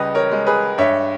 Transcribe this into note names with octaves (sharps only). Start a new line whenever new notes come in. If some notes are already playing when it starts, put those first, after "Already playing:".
Already playing: C#2 G3 B4 D#5
A#4 C#5
G#3
G#4 B4
G2 C#5 E5